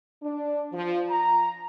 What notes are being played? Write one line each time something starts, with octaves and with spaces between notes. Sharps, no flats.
D4
F3
A#5